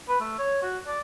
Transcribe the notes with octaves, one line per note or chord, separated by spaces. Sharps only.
B4
A3
C#5
F#4
D5